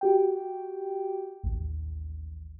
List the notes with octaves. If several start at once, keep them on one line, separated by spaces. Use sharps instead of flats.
F#4 G4 G5
A1 D#2